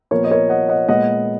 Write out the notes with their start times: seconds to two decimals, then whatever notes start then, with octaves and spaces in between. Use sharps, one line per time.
0.11 A#2 F3 B3 A#4 C#5
0.24 D#5
0.31 A#4 C#5
0.49 D#5 F#5
0.69 D#5 F#5
0.88 A#2 G#3 B3 D#5 F#5